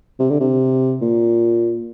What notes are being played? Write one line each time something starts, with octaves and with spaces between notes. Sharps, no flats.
C3
D3
C3
A#2